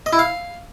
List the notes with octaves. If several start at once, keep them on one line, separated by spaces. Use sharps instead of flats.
D#5
E4
F5